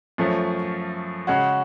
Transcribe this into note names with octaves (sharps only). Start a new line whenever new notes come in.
F#2 F3 A3 C#4
C#3 G#3 C#4 F#4